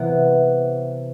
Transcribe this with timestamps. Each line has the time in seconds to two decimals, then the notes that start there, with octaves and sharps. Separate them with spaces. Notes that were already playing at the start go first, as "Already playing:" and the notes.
Already playing: C3 E3 B3 E4 F#5